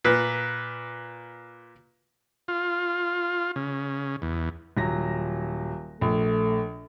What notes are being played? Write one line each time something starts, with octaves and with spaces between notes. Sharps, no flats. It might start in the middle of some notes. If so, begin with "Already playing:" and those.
A#2 B4
F4
C#3
E2
D#1 F#3 A#6
A#1 A3